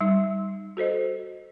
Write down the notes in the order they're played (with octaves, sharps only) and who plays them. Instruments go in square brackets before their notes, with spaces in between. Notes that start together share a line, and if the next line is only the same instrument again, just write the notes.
[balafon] G3 D#4
F#4 A4 C5 D#5